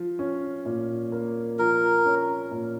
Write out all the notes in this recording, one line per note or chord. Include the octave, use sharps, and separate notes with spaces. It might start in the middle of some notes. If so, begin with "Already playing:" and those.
Already playing: F3
C#4
A#2
A#3
F3 A#4
C#4
A#2